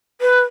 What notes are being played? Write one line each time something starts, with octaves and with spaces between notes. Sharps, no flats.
B4